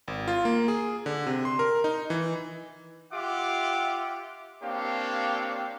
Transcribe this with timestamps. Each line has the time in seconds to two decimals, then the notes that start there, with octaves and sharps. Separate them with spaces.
0.08 G#1
0.28 F4
0.45 A#3
0.68 G#4
1.06 D3
1.26 C3
1.45 C6
1.59 A#4
1.84 D#4
2.10 E3
3.13 F4 G4 E5 F#5 D6
4.63 A#3 C4 D4 G4 C#5 F5